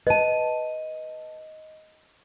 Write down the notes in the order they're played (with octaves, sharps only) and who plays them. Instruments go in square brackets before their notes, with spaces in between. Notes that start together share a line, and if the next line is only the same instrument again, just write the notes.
[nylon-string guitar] B4 A5 [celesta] D#5 D#7